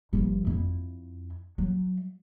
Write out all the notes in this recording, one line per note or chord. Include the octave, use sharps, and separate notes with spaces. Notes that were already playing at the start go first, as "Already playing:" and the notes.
G1 F3
F2 E4
F#3